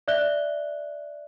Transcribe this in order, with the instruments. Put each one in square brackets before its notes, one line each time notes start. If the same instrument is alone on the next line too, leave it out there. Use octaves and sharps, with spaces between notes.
[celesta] D5 E5 F#6 G7